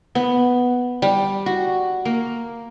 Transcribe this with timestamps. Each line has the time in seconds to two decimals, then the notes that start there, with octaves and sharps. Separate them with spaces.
0.15 B3
1.02 G3
1.46 F#4
2.05 A#3